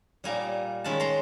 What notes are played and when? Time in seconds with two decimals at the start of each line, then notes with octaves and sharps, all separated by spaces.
0.24 A#2 G3 A#3 D#4 G#5 A#5
0.84 D#3 G#3 C#4 A5 B5
1.00 A#5 C6